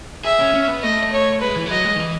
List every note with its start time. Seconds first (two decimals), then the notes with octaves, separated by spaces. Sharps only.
0.24 G#4 E5
0.39 C#4
0.54 C#4
0.68 B3
0.82 A3 D#5
1.13 C#5
1.41 G#3 B4
1.56 E3
1.66 G#3
1.71 F#3 D#5
1.85 G#3
1.96 D#3
2.00 E3